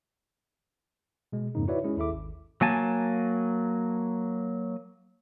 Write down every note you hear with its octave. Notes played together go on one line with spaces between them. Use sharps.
B2 G#3
F2 G#2 C#3 A#3 D#4
E4 F#4 B4 C#5 D5 E5
G#3 C#4 E4 G#4
D#2 E4 A4 E5 D6
G#1
F#3 A#3 G#5 A5